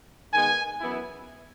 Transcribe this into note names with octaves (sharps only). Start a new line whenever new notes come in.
D#3 G#3 B3 G#5
F#2 E3 B3 E4